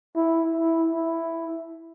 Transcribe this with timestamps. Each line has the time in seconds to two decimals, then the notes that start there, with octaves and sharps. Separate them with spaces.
0.16 E4
0.56 E4
0.94 E4